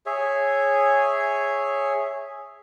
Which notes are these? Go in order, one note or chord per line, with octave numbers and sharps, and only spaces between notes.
G#4 C#5 E5